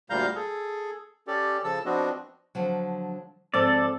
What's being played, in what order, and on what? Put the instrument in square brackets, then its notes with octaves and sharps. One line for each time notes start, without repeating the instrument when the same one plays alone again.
[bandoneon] D2 A#2 G3 F5 A#5 G6
G#4 A4
C#4 G4 A4 D5
C#3 F3 A4 A5 E6
F3 B3 C4 D4 F#4 D#5
[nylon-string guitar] D3 F3 F#3
[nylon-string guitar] G#2 F3 C4 [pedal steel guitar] A4 D5